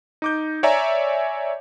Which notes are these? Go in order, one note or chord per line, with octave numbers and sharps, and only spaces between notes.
D#4 D6 G6
C#5 D5 E5 G#5 A#5